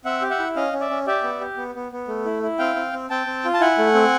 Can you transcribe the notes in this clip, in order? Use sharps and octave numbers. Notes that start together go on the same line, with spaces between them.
C4 E5 F#5
G4
E5 F#5
E4
C#4 D#5 F5
C#4
D5 E5
C#4
G4 D5 E5
B3
G4
B3
B3
B3
A3
E4
E4
C4 F5 G5
C4
C4
C4 G5 A5
C4
F4
A5
E4 F#5 G#5
A3
C4